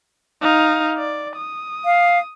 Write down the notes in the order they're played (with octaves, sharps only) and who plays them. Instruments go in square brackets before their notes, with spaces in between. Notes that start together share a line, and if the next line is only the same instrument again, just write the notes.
[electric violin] D#4 F5
D5
D#6
[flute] F5